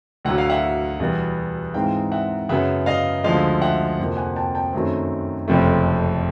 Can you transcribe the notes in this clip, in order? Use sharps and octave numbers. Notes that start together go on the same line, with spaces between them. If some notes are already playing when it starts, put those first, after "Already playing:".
D2 D3 F#3 F#5
F5
E5 F#5
E2 B2 G3 B3
G#2 E3 G#3 C4 D#4 F5 G5
E5 F#5
F#2 C#3 F#3 B3 E5 F#5
D#5 F5
D2 D3 F3 G#3 D#5 F5
E5 F#5
F2 C3 F3 A#3
F#5 G#5
G5 A5
G5 A5
F#2 D#3 F#3 A3 C4
F#1 F2 C3 F3 A3